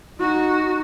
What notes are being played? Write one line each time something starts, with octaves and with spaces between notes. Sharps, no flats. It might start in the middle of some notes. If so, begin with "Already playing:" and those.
D#4 F#4